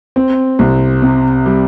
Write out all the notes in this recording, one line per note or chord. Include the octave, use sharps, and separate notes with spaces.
C4
C2
C3
G3